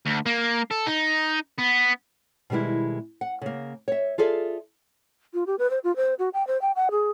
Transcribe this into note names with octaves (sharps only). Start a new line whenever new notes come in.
D2
A#3
A4
D#4
B3
B2 D#3 G3 G#3 E4
F#5
C#3 A#3
C#5 E5
F4 G#4 A4 D5 E5
F4
G4
B4
C5
F4
C5
F#4
G5
C5
G5
F#5
G#4